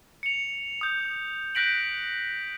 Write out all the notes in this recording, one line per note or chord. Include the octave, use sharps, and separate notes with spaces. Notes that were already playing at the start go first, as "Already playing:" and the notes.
C#7 F7
D#6 G6
F#6 G6 A#6 B6 D7 F#7